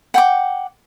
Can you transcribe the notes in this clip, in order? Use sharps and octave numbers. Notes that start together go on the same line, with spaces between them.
F#5 G5 D6